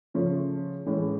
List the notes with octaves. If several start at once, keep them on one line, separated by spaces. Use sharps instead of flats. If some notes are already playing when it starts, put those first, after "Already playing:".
C#3 F3 A3 C#4
A2 E3 G#3 C#4